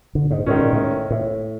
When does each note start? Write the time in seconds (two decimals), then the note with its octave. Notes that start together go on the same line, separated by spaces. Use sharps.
0.15 D3
0.31 G#2
0.46 A2 D#3 G#3 C#4
0.59 A#2
0.73 A2
1.11 A2